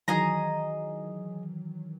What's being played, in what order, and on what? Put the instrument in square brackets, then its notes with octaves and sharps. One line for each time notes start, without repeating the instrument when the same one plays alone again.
[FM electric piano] D#3 E3 F#3 [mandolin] G#4 D#5 A#5